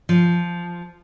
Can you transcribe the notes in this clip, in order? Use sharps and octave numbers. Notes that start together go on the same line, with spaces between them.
F3